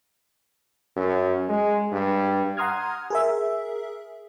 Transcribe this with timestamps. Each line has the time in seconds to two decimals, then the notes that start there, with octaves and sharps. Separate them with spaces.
0.97 F#2
1.49 G#3
1.92 G2
2.57 F#5 A#5 C6 D#6 F6 G#6
3.10 G#4 A#4 E5